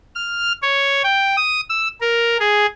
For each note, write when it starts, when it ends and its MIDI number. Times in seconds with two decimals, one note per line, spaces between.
0.16 0.53 89
0.62 1.02 73
1.03 1.36 79
1.37 1.61 87
1.69 1.88 88
2.01 2.37 70
2.39 2.66 68